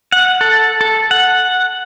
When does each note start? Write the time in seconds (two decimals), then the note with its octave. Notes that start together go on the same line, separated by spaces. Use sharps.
0.12 F#5
0.41 A4
0.81 A4
1.11 F#5